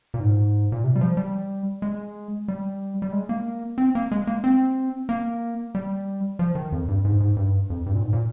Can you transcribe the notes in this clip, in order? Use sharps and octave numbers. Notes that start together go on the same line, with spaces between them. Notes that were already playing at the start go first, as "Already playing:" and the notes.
A#2
G#2
A#2
C3
G3
F3
G3
G#3
G3
G3
G#3
A#3
C4
A#3
G#3
A#3
C4
A#3
G3
F3
D#3
F2
G2
G#2
G#2
G2
F2
G2
A#2
G#2
A#2